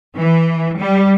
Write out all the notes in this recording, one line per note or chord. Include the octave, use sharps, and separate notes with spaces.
E3
G3